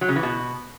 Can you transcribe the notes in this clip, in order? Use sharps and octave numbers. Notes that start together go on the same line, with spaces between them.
F#3
C#3
E3
B2